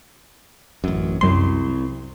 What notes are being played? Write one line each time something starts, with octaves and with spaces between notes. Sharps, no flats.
A1 F#2
C2 F#2 C6